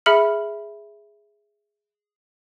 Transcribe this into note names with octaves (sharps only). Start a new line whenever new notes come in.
G#4 E5 B5 F6 C#7 F#7